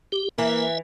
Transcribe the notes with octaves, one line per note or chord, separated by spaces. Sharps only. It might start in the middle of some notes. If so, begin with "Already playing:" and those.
G4
E3 A#3 E5